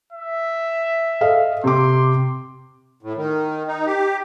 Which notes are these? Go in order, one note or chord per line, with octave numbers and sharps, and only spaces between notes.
E5
A4 D#5 F5
C3 C6 D6
A2
D#3
D#4
G4